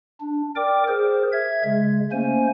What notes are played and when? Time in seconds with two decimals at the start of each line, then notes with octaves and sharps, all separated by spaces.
0.21 D4
0.56 A#4 D5 G5 D6
0.88 G#4 A#4 C5
1.32 E5 G#6
1.64 C#3 G#3
2.12 A3 A#3 C#4 C5 G#5